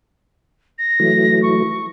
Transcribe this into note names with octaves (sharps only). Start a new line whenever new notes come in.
A#6
E3 F#3 A3
C#6